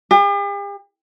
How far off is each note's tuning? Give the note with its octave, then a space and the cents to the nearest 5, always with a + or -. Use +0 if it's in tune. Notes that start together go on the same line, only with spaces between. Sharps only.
G4 +45